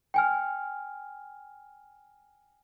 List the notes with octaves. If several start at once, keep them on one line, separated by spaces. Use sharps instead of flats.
G5 G#5 F6